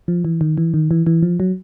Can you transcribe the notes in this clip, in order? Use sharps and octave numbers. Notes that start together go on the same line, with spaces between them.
F3
E3
D#3
E3
D#3
E3
E3
F3
F#3